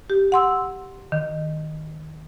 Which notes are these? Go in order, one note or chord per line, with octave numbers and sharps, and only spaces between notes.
G4
F#5 C6 E6
D#3